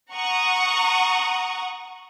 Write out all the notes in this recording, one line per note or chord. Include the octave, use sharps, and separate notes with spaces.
F#5 A#5 C#6 D#6